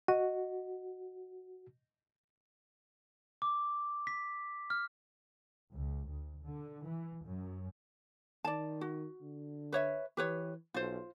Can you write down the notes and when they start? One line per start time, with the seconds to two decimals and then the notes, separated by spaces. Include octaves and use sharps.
0.08 F#4 D#5
3.42 D6
4.07 B6
4.70 F6
5.74 C#2
6.11 D2
6.46 D3
6.89 E3
7.27 F#2
8.45 D#3 D5 A5
8.81 F#4
9.21 D3
9.72 B4 C#5 E5
10.17 E3 G4 B4 C#5
10.74 B1 F4 C5